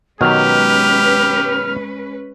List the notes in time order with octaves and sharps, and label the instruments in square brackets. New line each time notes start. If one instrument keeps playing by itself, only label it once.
[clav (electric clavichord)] B2 D#3 F#3 [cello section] G#3 C#4 B4 [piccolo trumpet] G4 [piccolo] F6